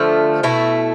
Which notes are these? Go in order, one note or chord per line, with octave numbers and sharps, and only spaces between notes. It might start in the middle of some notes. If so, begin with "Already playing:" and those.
Already playing: D3 F3 A3
B2 A3 E4